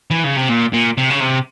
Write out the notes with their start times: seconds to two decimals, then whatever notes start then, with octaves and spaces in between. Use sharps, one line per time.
0.11 E3
0.24 C#3
0.37 C3
0.49 A#2
0.74 A#2
0.98 C3
1.10 C#3
1.20 C3